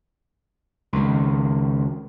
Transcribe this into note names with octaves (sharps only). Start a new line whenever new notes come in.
C#2 D#3